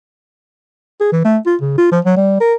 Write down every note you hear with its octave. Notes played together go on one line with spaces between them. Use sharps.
G#4
E3
A3
F4
C#3
F4
F3
F#3
G3
A#4